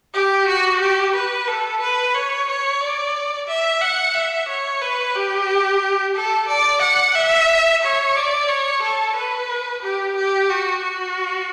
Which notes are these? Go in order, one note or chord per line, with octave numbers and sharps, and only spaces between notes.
G4
F#4
G4
B4
A4
B4
C#5
C#5
D5
E5
F#5
E5
C#5
B4
G4
A4
D5
F#5
E5
C#5
D5
C#5
A4
B4
G4
G4
F#4
F#4